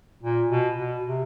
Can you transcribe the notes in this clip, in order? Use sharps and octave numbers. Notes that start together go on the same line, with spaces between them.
A#2
B2
B2
C3